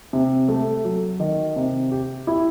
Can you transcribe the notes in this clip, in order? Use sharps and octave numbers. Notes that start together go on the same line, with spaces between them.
C3
A3
F#3
D#3
C3
G4
E4